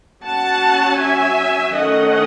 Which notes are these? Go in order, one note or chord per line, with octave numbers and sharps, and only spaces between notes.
F#3 C#4 F#5 A5
E5 G#5
D#3 A3 C#4 D#5 F#5